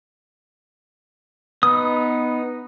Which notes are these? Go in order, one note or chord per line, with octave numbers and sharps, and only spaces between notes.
B3 D#4 D#6